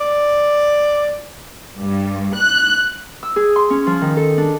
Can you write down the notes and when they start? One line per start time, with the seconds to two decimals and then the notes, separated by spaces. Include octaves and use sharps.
0.01 D5
1.78 G2
2.36 F#6
3.23 E6
3.36 G#4
3.56 C6
3.70 C#4
3.87 F3
4.01 D#3
4.17 A4
4.38 D4